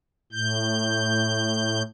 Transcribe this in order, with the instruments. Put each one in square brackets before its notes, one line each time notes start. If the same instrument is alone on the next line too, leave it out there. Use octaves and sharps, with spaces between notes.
[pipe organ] A2 G6